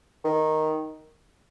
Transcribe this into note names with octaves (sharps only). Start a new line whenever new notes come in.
D#3